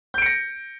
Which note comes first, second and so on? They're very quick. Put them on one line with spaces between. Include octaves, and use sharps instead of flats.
G6 D7 C#7 A#6